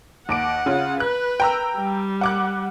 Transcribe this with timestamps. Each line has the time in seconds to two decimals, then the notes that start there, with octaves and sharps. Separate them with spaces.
0.29 D#2 F#5 D6 D7
0.66 C#3 C#4 F4
1.00 B4 F#6
1.40 G5 A#5 E6
1.78 G3
2.21 F#5 D6 F#6